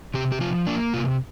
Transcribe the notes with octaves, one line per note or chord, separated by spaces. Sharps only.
C3 G4
G4
F3 F4
A#3 D4
C3 F4